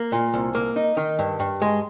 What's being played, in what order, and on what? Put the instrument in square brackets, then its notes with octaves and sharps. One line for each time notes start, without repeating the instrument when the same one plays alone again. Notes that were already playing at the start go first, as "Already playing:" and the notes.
Already playing: [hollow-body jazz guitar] A#3
A#2
C2
A#3
D#4
D#3
G2
G2
G#3